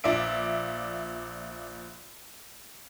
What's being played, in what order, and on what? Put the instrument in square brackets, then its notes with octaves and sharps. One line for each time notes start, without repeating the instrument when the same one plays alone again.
[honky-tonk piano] A#1 F4 D5 E5 D7